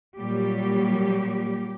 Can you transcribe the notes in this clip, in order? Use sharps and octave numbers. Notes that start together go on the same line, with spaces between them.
A#2 F#3 G3 G4